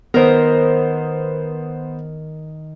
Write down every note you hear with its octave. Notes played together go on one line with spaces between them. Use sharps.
D#3 B3 A#4 C5